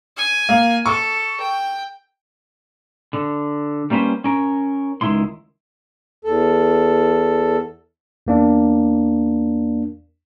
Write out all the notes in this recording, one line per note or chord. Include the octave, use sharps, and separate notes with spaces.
G#5
A#3
A4 C#6
G5
D3
G3 A#3 C#4 B4 C5
C#4 A#4
C#2 G#2 D#3 E4 C6
E2 A4
E2 A#3 D4